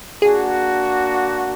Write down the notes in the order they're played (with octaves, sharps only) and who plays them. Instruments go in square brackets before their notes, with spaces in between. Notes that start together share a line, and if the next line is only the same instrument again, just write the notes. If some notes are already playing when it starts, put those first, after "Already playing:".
[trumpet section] A#3 D4 F#4 [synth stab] G#4